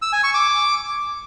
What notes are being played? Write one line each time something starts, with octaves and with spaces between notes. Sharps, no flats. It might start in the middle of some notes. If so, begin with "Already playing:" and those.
E6
G#5
C#6
D6